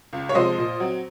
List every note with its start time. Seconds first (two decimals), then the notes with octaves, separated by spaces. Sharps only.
0.13 C#2
0.29 C#5
0.34 C3 F3 G#3 C5 D#5
0.58 A#2
0.80 F#3 C4